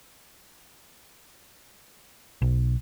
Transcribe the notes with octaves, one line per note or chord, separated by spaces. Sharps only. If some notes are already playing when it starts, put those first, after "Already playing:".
B1